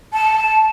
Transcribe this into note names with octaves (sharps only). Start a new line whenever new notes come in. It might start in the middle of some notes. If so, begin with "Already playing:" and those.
A5